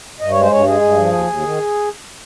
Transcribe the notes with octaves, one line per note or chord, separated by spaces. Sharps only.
G2 D#5
C#5
G#3
C5
G2 C#5
G#3 G#4
G2
F3
D#2
D#2
D#3